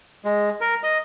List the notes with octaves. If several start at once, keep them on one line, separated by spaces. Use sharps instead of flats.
G#3
A#4
D#5